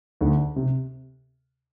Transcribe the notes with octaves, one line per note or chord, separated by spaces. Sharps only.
D2 D3
C3